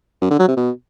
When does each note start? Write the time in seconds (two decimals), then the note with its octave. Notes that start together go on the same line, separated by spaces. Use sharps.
0.22 F#2
0.30 D3
0.39 F#3
0.48 C3
0.57 B2